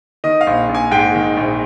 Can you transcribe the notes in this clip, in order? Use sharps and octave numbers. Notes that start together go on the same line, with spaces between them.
D#3 D#5
F5
A#1
A#1
G#5
G#2 G5
D#3
A#1